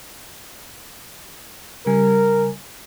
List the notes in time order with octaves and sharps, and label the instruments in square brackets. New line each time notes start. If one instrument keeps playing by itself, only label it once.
[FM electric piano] C#3 G3 G#5 [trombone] A#4